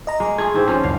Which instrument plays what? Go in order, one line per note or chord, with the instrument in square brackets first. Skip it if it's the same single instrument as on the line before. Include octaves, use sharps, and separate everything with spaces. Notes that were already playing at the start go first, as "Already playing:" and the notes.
[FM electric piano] D#5 A#5
[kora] G#3 A#3
[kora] A3 F4 [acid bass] G#4 [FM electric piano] G#6
[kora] G#2 E3 C4
[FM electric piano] G#1 [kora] F3 [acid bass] C#4
[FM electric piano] C#2 [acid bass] F#2 [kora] F5